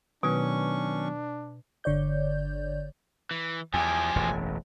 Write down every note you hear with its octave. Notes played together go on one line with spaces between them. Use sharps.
B2 D#3 F#3 B3 C#4 D4 C#6
G1 D3 C#5 D5 G6
E3
E2 F3 G4 G#5
E1 A1 F#2